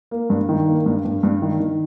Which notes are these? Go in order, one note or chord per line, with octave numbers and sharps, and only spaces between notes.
A#3
G2
D#3
A#3
G2
G2
G2
D#3
D#3